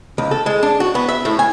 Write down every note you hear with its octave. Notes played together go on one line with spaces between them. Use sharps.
C#2
A4
G#3
D4
F#4
B3
E5
A2
G#5